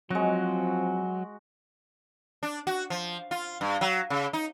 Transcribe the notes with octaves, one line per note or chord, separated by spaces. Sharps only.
F3 F#3 G#3 C4 F#4
D4
F#4
F3
F4
G2
F#3
C#3
D#4